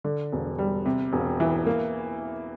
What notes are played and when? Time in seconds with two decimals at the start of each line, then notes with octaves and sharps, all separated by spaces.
0.04 D3
0.32 E1
0.58 G3
0.86 C3
1.13 E1
1.40 E3
1.66 A#3